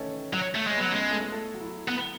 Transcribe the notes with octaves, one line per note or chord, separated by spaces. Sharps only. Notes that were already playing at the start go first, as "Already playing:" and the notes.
Already playing: D#3 E3 A3 C#4 D#4 A4 C#5
F#3
A3
G#3
B3 B4
F#3
C#4 C#5
G#3
B3 B4
A3 A4
G#3 G#4
A3 A4
F#3 F#4
E4
F#3 F#4
B3